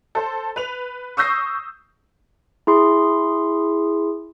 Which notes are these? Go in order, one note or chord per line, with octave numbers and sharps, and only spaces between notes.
A4 C5
B4 F7
C#6 D#6 E6 G6 A#6 C7
E4 G#4 C6